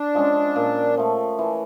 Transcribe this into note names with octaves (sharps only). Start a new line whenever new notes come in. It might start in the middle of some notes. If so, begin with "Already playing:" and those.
Already playing: D4
F3 G#3 C#4
A#2
F3 A3
E3